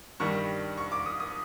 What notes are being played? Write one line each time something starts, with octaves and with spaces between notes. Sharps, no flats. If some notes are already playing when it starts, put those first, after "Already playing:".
G2 D#3 G3 C#6
C#6
D6
D#6
D#6